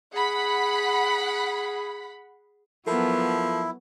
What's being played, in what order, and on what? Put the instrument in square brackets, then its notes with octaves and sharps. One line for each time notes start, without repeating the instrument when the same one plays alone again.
[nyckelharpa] G#4 [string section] F#5 B5
[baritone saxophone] F3 [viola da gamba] F#3 B3 [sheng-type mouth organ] E4 [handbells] A4 A#4 A5